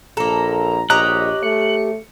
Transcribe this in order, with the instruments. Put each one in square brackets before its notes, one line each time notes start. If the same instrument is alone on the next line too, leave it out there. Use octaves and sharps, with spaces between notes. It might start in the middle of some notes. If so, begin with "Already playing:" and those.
[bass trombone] A#1 [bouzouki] A#3 A4 [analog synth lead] A#5
[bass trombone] A#1 [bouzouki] G4 C#5 A#5 [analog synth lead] D#5 [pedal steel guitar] F#6
[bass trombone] A3 [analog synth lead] C#7